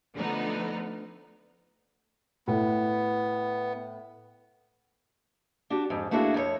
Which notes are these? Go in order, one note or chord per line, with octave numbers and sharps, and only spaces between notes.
D3 F3 A3 B3 D#4
A2 B3
D4 F#4 G4
F2 G#2
A3 A#3 D4 E4 F#4 G#4
F2 A4 C#5